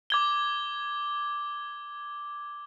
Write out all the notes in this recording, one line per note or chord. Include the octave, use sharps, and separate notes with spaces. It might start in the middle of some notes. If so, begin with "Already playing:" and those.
D6 G#6 G7